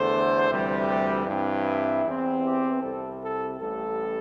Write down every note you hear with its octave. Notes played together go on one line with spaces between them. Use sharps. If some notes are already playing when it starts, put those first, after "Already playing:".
Already playing: E2 D3 A3 C5
D2 C3 E3 G3
G4
G2 E3 C4 E4
E2 E3 C4
G4
C2 C3 G3 A4
A4
A1 A2 G3 A4